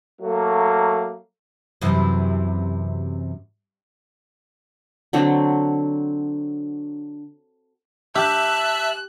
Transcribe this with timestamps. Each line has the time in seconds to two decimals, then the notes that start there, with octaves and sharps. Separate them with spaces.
0.21 F#3 A3 A#3
1.82 F#2 C3 E3
5.13 D3 F#3 C4 D4
8.15 G4 E5 A5 F#6